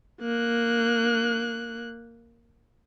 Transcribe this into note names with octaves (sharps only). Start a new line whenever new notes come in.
A#3 F#6